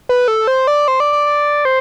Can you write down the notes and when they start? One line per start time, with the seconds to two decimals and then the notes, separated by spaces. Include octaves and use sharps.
0.09 B4
0.28 A4
0.47 C5
0.67 D5
0.88 C5
1.00 D5
1.13 D5
1.27 D5
1.65 C5